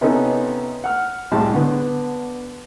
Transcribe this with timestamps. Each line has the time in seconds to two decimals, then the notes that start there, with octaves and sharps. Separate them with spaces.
0.01 C3 B3 C#4 D#4 A4
0.84 F#5 F6
1.31 C2 A2 G3 G#3 A5
1.54 D3 B3